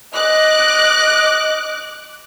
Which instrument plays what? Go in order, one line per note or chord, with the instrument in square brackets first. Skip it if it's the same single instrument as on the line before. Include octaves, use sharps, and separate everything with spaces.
[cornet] D#5 [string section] D6 F#6